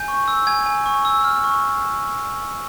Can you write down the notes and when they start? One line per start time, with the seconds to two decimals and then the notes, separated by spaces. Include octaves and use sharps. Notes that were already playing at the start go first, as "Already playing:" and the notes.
Already playing: G#5 G6
0.08 C#6
0.28 E6
0.47 G#5 G#6
0.66 G#5
0.86 C#6
1.05 E6
1.24 F6
1.44 C#6